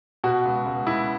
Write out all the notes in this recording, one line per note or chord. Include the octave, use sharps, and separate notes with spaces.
B2 F#4
C#2
C#2
C#2 E4